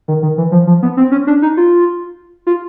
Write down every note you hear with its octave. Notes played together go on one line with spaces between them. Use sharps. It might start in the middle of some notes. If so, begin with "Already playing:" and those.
D#3
D#3
E3
F3
F3
B3
C4
C#4
D4
D#4
F4
F4